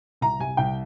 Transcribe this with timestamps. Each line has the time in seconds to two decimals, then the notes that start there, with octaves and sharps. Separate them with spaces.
0.21 C2 A#5
0.39 C3 G#5
0.57 C2 G5